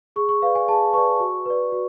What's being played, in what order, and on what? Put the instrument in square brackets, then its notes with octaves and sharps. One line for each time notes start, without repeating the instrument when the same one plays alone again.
[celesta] G#4 C#6
C#6
B4 D5 F5
G#5
G#4 A5
B4 D5 C#6
F#4
B4 D5
F#4